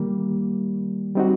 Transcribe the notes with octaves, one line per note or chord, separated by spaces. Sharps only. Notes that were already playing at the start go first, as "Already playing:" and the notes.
Already playing: D#3 G3 A#3
G3 C4 D#4 F#4